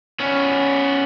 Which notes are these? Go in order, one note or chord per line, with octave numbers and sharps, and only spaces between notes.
B3 C#4